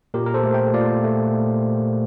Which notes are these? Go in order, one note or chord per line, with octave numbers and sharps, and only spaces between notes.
A#2 G4 A#4
A#4
A4 C5
A3
E5 G5
A#2 D5 F5
A3